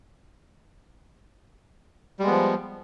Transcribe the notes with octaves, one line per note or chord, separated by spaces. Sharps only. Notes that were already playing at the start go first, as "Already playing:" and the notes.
F3 G3 G#3 B3